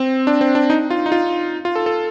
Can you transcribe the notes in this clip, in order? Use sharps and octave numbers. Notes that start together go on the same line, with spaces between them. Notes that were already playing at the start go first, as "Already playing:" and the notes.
Already playing: C4
D4
C4
D4
D#4
F4
D#4
F4
F4
A4
A4